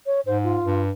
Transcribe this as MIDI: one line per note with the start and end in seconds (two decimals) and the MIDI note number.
0.06 0.21 73
0.26 0.58 44
0.26 0.38 72
0.44 0.83 65
0.66 0.91 43